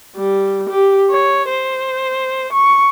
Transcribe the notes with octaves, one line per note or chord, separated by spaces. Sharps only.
G3
G4
C#5
C5
C#6